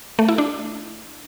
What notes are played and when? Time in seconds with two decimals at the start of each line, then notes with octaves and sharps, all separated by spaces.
0.19 A3
0.28 E4
0.38 D4